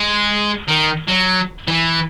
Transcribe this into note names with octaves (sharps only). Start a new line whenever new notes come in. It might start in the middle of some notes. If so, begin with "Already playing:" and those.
Already playing: G#3
D#3
F#3
E3